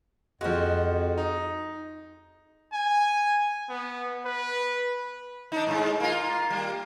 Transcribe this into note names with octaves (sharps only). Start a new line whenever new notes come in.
F2 F3 G#3 F#4 F#5
D#4
G#5
B3
B4
D4 D#4
G#2 G#3
A#3 F4
G3 A#3